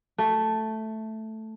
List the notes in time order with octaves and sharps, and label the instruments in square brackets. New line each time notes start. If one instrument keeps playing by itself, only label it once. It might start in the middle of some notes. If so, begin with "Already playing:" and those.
[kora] A3